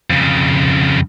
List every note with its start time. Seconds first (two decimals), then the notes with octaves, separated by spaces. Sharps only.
0.10 F2 C#3